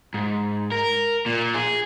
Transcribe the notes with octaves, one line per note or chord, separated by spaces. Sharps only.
G#2
A#4
A#2
G#4